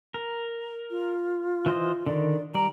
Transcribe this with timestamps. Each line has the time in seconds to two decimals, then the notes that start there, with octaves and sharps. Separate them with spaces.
0.14 A#4
0.91 F4
1.66 E3 C5 D#5
2.06 D3 D#3 D5
2.55 G3 D5 A#5